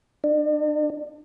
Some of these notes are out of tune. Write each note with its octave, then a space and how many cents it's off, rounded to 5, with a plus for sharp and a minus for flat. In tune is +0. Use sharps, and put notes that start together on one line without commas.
D4 +40